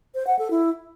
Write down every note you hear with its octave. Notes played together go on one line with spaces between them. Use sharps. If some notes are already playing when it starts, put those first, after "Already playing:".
C5
F#5
A4
E4